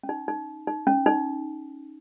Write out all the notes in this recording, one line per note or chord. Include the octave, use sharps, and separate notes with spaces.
C#4
D#4
D#4
D#4
C#4
D#4